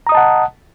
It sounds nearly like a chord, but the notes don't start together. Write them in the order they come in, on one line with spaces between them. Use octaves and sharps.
A#5 D#6 D#5 A5 F#5